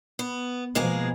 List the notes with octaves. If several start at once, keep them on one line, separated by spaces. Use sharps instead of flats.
B3
B2 F3 G#3 A#3 G#4